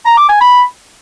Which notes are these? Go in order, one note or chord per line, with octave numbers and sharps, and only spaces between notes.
A#5
D6
G#5
B5